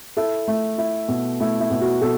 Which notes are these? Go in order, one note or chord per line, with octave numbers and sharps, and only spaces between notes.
E4 A4
A3
E4
B2
A3 E4
E4
B2
F#4
B2 A4